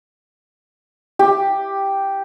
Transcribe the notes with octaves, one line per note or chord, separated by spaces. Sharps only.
G4